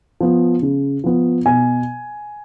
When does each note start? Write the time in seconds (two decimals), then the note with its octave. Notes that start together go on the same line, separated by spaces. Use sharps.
0.21 F3 B3
0.62 C#3
1.04 F3 B3
1.46 B2 G#5